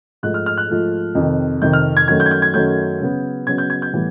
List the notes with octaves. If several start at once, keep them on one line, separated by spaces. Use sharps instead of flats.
G#2 F3 A3 F#6
F6
F6
F#6
G#2 F3 A3
F2 C3 D#3
F2 C3 D#3 G6
F6
G#6
F#2 D#3 F#3 A3 G#6
G6
G#6
G6
G#6
F#2 D#3 F#3 A3 G6
C#3 F#3 B3
C#3 F#3 B3 G#6
G6
G#6
G6
A2 E3 G3 B3